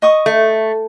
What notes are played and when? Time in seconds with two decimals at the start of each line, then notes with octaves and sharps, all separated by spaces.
0.02 D#5 C#6 D#6
0.26 A3